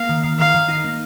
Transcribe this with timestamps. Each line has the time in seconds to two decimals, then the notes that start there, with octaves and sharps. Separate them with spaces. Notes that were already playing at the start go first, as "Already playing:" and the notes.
Already playing: A#3 F5
0.09 D#3
0.24 D#3
0.39 D#3 F5
0.54 D#3
0.69 D#4
0.84 A#3